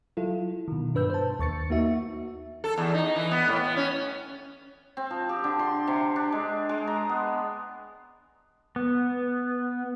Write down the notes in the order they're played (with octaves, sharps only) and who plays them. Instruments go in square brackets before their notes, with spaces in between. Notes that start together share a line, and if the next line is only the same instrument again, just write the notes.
[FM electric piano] F#3 E4 F4 A4
B2 D#3
G2 D4 B4 E6 G6
C5 A5
D#2 C#6 A6 C#7
A#3 D#4 F#4 E5
[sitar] A4
E2
D#4
E3
B3
A2
B3
C#4
[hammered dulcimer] C4
F3
G4
D3
C6
C3
D4
G#3
G#3
A#5
B3
[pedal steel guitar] B3